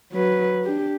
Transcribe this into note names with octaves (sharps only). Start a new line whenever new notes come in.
F#3 B4
D4 G4